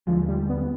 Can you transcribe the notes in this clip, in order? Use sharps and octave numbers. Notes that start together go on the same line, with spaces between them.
D#2 D3 F3 G#3
G3
B3